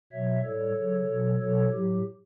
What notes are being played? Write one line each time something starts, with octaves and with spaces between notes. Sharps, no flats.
B2 F#3 C#5 E5
A2 G3 A4 C#5
C#3 F#3
B2 F#3
B2 F#3 A4 C#5
A2 F#3 G4